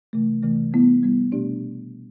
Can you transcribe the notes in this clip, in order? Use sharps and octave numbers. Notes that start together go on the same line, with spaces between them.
C3 E3 A3
C3 E3 A3
G3 B3 E4
G3 B3 E4
B2 A3 D4 G4 D5